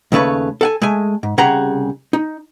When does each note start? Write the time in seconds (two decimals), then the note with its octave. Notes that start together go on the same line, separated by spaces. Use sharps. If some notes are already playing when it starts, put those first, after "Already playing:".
0.12 D#2 C#3 A3 B4 C#5
0.61 A4 F#5 G#5
0.82 G#3 A3 G#5
1.23 G#2
1.38 C2 C#3 G4 G#4 F#5 A#5
2.13 D#4